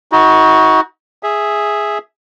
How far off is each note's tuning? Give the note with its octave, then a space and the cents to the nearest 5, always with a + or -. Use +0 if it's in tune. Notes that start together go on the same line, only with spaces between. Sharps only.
D#4 +40 F#4 +0
G#4 +0 E5 +0